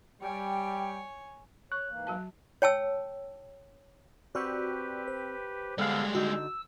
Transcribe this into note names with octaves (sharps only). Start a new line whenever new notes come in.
G3 C#5 G5 G#5
C#5 C#6 F#6
G#2 E3 A#3
F#3 F#4 A5
C#5 G5 A5 E6
C4 F#4 G4 B4 D5 C#6
C5
D3 G3 G#3 B3 A4 F5
D3 D#4 F#4 E6